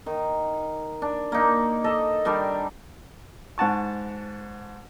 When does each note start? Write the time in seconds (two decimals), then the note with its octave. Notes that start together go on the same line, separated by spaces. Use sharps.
0.06 D#3
1.02 D4
1.32 A#3 D#4
1.84 A4 D#5
2.25 D#3 G3 D4 G4
3.58 G#2 F#5 A5 C#6